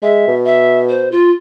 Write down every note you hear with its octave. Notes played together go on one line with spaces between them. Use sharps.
G#3 E5
B2
E5
C5
F4